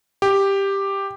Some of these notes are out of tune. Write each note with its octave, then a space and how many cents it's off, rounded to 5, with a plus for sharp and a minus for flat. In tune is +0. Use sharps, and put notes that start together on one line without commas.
G4 +5